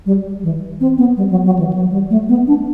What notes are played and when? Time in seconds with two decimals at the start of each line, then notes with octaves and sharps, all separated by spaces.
0.06 G3
0.44 E3
0.81 C4
0.98 B3
1.17 G3
1.31 F#3
1.45 F#3
1.59 E3
1.73 F#3
1.91 G3
2.10 A3
2.29 B3
2.47 D4